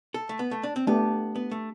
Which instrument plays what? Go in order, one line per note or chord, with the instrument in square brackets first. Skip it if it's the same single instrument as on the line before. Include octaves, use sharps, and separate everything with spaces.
[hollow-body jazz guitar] A4
A3
B3
A3
D4
C4
[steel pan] A3 D4 G4 [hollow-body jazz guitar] B3
[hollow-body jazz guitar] B3
A3